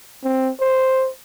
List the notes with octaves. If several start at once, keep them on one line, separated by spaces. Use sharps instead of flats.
C4
C5